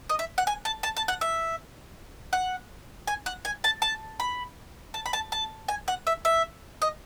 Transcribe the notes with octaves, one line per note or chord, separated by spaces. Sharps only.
D#5
E5
F#5
G#5
A5
A5
A5
F#5
E5
F#5
G#5
F#5
G#5
A5
A5
B5
A5
B5
A5
A5
G#5
F#5
E5
E5
D#5